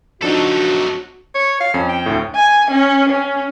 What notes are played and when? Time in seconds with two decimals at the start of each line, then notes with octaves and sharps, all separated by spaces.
0.22 F3 F#3 D4 D#4 F#4 A4
1.35 C#5
1.60 F5
1.74 F2 C#4
1.89 G5
2.06 D2 A2
2.35 G#5
2.71 C#4
3.09 C#4